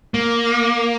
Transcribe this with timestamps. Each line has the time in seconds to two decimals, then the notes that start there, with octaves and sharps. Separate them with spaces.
0.14 A#3